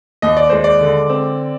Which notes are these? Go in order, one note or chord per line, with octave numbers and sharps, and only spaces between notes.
D#2 D#5
D5
G#3 C5
D5
D3
C4